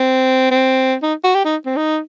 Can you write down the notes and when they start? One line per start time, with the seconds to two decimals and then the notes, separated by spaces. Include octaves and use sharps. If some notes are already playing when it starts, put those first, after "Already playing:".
Already playing: C4
0.51 C4
1.03 D#4
1.24 F#4
1.35 G4
1.45 D#4
1.66 C4
1.76 D#4